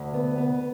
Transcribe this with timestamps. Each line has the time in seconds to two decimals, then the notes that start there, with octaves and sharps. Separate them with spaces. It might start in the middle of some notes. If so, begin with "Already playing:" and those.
Already playing: D2
0.14 B3
0.38 B3